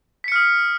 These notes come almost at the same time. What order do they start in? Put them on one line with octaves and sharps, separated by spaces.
B6 C#7 F6 D#6